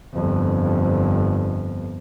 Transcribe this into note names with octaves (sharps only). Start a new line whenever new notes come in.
G1 F2